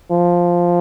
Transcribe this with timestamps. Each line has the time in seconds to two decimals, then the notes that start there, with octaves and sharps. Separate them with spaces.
0.11 F3